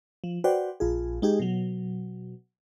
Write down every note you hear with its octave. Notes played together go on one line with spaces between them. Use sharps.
F3
F#4 B4 C5 D5 F#5 G5
A#1 F4 G#4
G#3 D#4 G4 G#4
B2 F#3